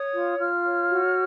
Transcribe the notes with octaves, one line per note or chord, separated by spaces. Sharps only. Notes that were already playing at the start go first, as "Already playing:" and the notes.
Already playing: C#5 D#6
F4
F4 F6
C#5
F#4